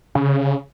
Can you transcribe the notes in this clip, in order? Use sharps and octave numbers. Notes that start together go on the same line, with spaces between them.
C#3